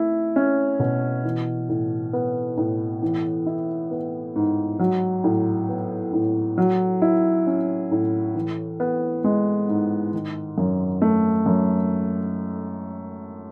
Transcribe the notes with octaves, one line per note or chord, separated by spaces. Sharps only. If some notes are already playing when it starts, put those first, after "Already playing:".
Already playing: A3 E4
C#4
B2
E3
A2
B3
A2
E3
E4
B3
G#2
F#3
A2
B3
A2
F#3
E4
C#4
A2
E3
B3
G#3
G#2
D#3
F#2
A3
F#2